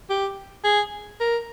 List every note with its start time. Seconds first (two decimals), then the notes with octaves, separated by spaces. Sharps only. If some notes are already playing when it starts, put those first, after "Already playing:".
0.10 G4
0.64 G#4
1.20 A#4